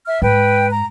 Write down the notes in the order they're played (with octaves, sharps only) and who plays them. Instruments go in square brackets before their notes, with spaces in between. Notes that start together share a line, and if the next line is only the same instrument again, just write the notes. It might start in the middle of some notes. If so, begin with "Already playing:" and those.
[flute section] E5 F6
[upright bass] G#2 [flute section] B4 G5
[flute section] A#5